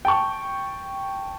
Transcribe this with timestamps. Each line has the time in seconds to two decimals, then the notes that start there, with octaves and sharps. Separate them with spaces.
0.05 G5 A5 C#6